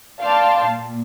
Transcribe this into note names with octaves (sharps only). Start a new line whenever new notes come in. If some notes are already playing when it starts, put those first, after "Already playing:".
D5 F5 G5 A5 C6
A#2